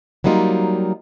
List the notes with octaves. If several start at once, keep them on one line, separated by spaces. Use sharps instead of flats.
F#3 G3 A#3 D#4 F4